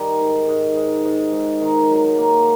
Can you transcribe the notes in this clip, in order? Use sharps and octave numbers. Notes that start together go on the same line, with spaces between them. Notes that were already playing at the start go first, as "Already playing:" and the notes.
Already playing: D#3 G3
G#2
G#2
G#2
G#2
G#2
D#3
F#3
A#3